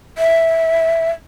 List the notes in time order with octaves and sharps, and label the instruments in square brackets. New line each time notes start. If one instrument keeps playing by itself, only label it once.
[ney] E5